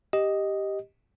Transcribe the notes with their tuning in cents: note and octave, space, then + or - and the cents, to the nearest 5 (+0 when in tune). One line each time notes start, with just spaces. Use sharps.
G4 +0 D#5 +0